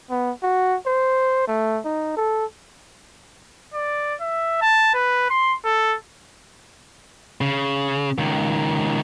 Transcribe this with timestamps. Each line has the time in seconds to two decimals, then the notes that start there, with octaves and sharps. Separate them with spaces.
0.10 B3
0.43 F#4
0.86 C5
1.48 A3
1.85 D#4
2.17 A4
3.74 D5
4.21 E5
4.61 A5
4.94 B4
5.30 C6
5.65 A4
7.41 C#3
8.19 C#2 D#3